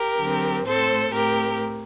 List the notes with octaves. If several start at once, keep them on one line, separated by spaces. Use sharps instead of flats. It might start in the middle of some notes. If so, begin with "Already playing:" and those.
Already playing: G4 A#4
D3 F#3 C4
A2 A3 C4 A4 C5
A2 A3 C4 G4 A#4